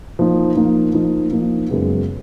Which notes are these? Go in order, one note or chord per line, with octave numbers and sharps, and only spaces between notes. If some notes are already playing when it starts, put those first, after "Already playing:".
F3 A#3 D#4
F3 A#3 D#4
F3 A#3 D#4
F3 A#3 D#4
F#2 C#3 G#3 B3